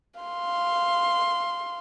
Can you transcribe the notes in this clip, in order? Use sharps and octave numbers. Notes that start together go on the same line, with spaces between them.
F5 C6